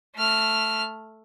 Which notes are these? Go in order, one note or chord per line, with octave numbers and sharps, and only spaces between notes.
A3 F6